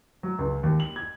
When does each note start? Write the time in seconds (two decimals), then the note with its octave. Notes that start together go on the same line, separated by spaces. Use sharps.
0.23 F#3
0.39 C#2
0.63 D#2
0.80 F#7
0.96 G#6